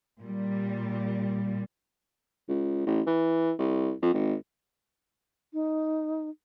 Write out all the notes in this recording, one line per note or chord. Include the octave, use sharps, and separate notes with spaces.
A#2 G3
C#2
A1
E3
C2
F2
G#1
D#4